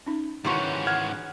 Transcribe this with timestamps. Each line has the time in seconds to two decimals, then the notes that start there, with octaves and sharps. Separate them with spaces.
0.06 C#4 D#4
0.45 G#2 D#3 E3 C#4 F#4 G4 C6 C#6
0.87 F#5 F6 G#6